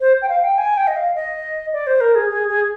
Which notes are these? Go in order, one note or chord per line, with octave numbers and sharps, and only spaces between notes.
C5
G5
F5
G5
G#5
G5
D#5
F5
D#5
D5
C5
A#4
G#4
G#4
G#4